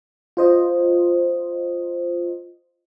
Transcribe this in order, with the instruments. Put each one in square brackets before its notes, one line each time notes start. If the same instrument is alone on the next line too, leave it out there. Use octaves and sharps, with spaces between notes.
[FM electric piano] F4 C5 D#5